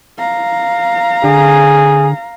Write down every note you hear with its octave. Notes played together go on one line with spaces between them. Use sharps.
F5 A#5
D3 G#4